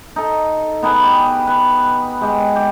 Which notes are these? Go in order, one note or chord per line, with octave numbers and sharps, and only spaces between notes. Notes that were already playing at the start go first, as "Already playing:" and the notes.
D#4 A4
B3 D#4 G#4 B4
G4
B4
G#3 G4
G4